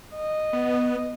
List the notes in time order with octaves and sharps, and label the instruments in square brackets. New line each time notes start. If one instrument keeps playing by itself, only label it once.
[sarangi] D#5
[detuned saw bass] B3